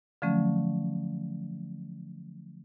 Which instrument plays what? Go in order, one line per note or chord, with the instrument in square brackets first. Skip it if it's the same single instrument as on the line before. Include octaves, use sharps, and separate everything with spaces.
[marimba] D3 F3 F#3 A3 C#4